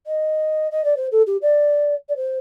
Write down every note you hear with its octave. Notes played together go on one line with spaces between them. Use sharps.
D#5
D#5
D5
C5
A4
G4
D5
D5
C5